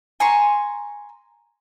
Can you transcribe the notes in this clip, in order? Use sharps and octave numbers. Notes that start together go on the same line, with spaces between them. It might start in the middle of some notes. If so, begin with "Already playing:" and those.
G#5 A#5 C6 C#6